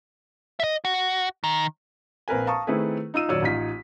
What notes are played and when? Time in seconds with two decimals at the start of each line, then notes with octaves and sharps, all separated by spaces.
0.60 D#5 E5
0.85 F#4
1.44 D#3
2.28 A#1 C4 A#4 B4 G#5
2.47 F5 A5 A#5 C#6 D#6
2.67 D#3 A3 C4 E4 G#4 B4
3.14 D#4 F4 E6 D#7
3.28 D#1 F#2 C#5 D5 E6
3.42 A1 D#4 F4 B6